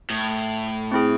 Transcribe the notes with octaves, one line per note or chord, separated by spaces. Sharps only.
A2
C4 E4 G#4